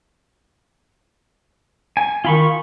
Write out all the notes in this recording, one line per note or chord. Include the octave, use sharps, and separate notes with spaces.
G#5
D#3 F4 B5 C#6